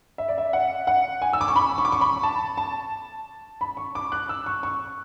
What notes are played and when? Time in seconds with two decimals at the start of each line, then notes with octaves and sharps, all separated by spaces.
0.18 E5
0.28 D5
0.38 E5
0.53 F#5
0.87 F#5
1.22 G#5
1.33 E6
1.41 D6
1.48 C#6
1.56 B5
1.78 C#6
1.85 D6
1.92 C#6
2.01 B5
2.23 A5
2.58 A5
3.61 B5
3.77 C#6
3.95 D6
4.12 F#6
4.29 E6
4.46 C#6
4.63 C#6